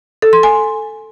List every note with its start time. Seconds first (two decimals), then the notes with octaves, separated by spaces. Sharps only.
0.22 A4
0.33 C6
0.43 G#5